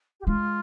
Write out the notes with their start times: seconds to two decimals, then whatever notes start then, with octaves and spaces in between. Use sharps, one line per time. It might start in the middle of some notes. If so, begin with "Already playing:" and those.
0.20 G4
0.27 G#3 F4